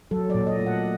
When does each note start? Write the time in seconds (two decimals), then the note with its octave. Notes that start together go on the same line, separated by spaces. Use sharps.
0.11 F#3 A4
0.30 A#2 D5
0.47 D#5
0.60 A3
0.66 F#5